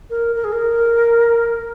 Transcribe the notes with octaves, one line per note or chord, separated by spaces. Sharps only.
A#4
A#4
G#4
A#4